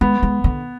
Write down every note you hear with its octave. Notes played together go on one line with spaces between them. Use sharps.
G#3 B3
G#3
D3